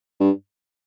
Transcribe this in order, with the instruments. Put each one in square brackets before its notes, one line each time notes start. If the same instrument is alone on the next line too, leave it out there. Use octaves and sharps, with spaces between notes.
[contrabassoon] G2